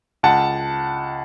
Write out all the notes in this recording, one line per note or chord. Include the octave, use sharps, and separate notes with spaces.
C#2 F#5 A5